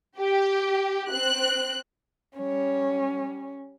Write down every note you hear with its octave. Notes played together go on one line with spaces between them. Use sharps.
G4
C4 F#6
G3 C#4 C#5